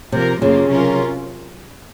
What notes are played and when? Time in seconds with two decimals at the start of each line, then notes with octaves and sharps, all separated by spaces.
0.12 C3 F3 A#3 F4 A#4
0.41 F#2 C#3 F3 A#3 F4
0.70 C3 F#3 C#4 F4 A#4